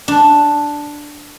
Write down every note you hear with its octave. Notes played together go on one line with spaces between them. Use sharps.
D4